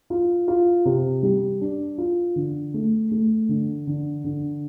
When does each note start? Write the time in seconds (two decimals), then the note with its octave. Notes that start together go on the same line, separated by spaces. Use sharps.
0.10 F4
0.48 F4
0.85 C3
1.23 G3
1.61 D4
1.98 F4
2.36 D3
2.74 A3
3.11 A3
3.49 D3
3.87 D3
4.24 D3